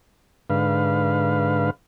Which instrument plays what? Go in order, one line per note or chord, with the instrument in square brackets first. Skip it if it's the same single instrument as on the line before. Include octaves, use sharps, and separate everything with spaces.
[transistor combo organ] G#2 D3 B4 F5